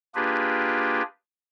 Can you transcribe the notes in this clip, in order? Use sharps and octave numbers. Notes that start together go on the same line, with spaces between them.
A#3 D4 F4 G4 G#4 B4